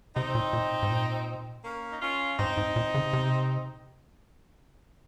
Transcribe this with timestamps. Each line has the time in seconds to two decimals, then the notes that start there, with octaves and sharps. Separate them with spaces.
0.16 C3 C4 D#4
0.35 A#2
0.53 A#2
0.83 G#2
0.90 A#2
1.64 A#3 C#4
1.92 D#4
2.02 C#4 F4
2.39 G#2 C4 D#4
2.57 G#2
2.76 A#2
2.95 C#3
3.13 C3